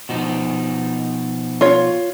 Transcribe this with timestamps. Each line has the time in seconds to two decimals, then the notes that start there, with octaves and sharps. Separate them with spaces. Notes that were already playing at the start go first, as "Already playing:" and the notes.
0.09 B2 F3 D#4
1.61 F4 C#5